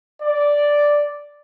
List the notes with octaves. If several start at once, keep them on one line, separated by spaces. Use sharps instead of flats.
D5